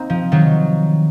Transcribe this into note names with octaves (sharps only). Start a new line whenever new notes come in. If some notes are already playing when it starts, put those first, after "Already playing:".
Already playing: A#3 C4 D#4
F3
D#3 F#3